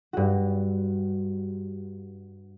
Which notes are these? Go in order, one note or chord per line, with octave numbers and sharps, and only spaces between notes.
G2 F#4